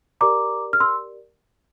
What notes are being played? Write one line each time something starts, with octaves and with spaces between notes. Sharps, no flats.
G4 A#4 D5 A#5 D6
F6
C6 E6